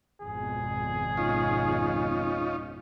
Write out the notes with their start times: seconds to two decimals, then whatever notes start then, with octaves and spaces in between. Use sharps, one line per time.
0.21 G#1 F2 B2 G#4
1.17 C#4 D#4 F4